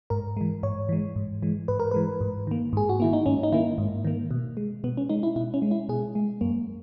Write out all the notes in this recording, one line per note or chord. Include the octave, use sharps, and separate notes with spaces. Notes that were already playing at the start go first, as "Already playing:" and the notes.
G#2 A#4
E3 G#3
G#2 C#5
E3 G#3
G#2
E3 G#3
G#2 B4
A#4
E3 G#3 B4
G#2
D#3 A#3
G#2 G#4
F#4
D#3 A#3 E4
D#4
G#2 C#4
D#4
D#3 A#3 E4
G#2
D#3 A#3
B2
G#3
B2 B3
C#4
G#3 D#4
E4
B2 E4
C#4
G#3
E4
B2 G#4
G#3
F#2 A#3